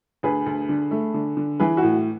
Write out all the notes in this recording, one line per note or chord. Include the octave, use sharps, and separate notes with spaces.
D2 G#4 B4
D2
D3
A3
D3
D3
E3 G#4 B4
F#4
A2